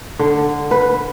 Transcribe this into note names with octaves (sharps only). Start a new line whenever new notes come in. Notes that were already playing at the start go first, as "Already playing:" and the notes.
D3
B4